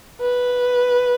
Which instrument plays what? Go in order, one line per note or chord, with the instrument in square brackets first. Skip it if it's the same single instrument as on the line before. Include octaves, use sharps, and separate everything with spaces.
[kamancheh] B4